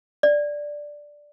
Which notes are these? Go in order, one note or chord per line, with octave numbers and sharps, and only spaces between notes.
D5